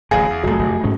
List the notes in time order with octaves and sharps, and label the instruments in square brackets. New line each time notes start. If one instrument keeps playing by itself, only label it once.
[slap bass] D1 A1 A2 [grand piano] G#4 [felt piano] F5
[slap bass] E2
[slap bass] F1 C2 [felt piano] F#3 A3
[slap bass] F1
G#2 G#3 C#4